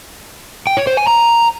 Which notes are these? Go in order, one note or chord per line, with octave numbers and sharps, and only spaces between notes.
G5
C#5
C5
G#5
A#5